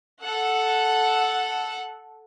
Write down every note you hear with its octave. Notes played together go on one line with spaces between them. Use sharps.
A4 F#5